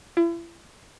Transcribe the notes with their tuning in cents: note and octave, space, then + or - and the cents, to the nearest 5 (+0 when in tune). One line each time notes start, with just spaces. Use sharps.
E4 +40